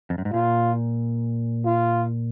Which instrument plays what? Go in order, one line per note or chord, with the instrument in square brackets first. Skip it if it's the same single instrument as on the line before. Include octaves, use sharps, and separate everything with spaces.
[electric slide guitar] F2
F#2
G#2
[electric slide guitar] A#2 [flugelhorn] F4
[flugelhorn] F4